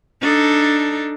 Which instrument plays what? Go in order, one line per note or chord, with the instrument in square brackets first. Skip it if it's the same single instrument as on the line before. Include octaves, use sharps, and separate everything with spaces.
[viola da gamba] D4 D#4 A4